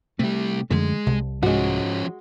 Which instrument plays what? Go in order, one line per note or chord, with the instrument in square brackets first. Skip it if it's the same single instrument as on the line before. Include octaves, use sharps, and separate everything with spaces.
[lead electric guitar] C3 G3 [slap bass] A3
[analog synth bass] F#2 [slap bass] D3 F3 A3 [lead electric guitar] G#3
[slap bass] C2 [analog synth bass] C3
[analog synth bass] G#2 [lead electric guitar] F3 C#4 [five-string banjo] G#3 F#4